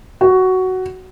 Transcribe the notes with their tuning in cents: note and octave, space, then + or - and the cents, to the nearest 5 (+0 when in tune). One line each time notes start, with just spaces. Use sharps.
F#4 +10